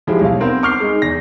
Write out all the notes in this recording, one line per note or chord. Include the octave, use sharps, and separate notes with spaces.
F3 G#3 E4 G4
B1 F5
B3 C4 A#4 C5
C#6 D6 F6 G6 C7
G#3 D#4
E2 A#6